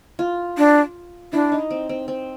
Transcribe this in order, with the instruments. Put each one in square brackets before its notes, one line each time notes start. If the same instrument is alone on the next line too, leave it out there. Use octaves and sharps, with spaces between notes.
[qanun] F4
[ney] D4
[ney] D4 [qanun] E4
[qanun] D#4
C4
C4
C4